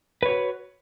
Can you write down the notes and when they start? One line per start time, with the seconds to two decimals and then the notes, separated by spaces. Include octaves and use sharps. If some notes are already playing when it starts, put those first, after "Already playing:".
0.23 B4
0.26 C#5
0.29 F#4